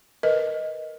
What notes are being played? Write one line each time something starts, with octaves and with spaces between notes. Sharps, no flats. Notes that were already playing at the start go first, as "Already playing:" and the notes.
A#4 B4 D#5